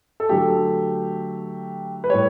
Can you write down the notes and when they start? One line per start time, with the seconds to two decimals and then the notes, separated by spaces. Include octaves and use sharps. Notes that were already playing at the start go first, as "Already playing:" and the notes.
0.20 A4
0.29 D3 F#3 A3 G4
2.04 B4
2.09 A2 G3 C#5